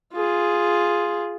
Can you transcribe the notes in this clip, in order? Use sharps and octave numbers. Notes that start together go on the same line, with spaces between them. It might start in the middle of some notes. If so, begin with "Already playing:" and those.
F4 G#4